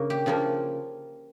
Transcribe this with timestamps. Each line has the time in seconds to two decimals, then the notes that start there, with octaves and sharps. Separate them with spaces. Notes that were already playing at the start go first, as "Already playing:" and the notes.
Already playing: C#3 A#3 A#4
0.10 G4
0.26 C#3 F3 A#3 F4